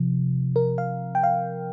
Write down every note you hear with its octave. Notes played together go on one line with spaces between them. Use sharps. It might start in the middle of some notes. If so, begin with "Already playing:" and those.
Already playing: C3 F3
A#4
F5
G5
F5